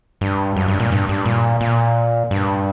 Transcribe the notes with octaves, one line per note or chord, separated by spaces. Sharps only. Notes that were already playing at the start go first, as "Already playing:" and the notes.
G2
F#2
G2
A#2
G2
G2
A#2
A#2
G2